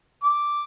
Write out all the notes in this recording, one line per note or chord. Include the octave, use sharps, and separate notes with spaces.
D6